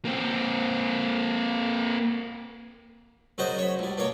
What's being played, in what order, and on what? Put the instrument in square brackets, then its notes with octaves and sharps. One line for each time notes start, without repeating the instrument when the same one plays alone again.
[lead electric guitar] A#3 C4
[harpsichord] F#2 C#3 F#4 C5 D#5
C#5 B5
C#2 G3
B2 A#3 C#5